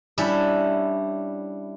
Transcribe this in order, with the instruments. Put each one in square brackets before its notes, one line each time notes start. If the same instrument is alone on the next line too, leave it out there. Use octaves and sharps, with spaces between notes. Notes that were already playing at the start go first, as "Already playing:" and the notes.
[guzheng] G3 C#4 D4 E4 E5